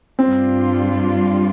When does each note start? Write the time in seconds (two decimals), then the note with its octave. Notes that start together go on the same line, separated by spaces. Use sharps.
0.19 G2 G3 C4 D4 F4